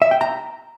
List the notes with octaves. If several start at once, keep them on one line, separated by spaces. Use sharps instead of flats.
E5
G5
A#5